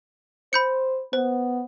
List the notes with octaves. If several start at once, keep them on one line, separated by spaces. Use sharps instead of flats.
C5 B5 G6 C#7
B3 C5